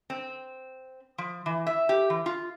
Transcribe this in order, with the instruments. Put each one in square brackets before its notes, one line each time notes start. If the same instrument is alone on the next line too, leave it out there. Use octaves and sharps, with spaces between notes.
[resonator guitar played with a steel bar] C4
F3
E3
E5
G4
E3
F4